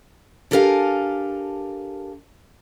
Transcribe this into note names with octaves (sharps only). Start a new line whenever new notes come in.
D4 G4 A4 A#4 F5 G#5